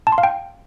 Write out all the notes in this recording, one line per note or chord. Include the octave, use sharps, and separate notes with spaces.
A5
C6
F5
G5